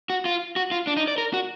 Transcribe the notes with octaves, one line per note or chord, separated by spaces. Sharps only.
F#4
F4
F#4
F4
D4
D#4
D5
A#4
F#4